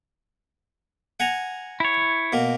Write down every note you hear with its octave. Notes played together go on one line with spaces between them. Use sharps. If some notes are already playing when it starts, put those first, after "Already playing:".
F#5 G#5 A#5
E4 C#5
B2 A#3